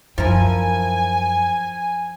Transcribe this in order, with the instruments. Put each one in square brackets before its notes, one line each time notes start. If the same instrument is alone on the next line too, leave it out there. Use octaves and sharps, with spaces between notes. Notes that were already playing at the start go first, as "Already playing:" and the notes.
[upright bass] F#2 [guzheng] F3 E4 A#4 [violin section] G#5